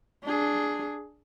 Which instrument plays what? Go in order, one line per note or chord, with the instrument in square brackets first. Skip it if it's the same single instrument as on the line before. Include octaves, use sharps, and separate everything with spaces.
[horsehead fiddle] D4 G#4